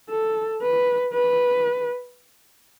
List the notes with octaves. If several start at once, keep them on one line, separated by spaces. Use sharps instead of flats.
A4
B4
B4